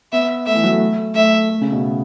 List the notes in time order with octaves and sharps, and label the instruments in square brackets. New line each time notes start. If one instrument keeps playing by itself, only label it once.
[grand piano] B3 [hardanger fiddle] E5
[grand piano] A3 [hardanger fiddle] E5
[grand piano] E3
F#3
A3
[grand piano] A3 [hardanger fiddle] E5
[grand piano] A3
C#3
B2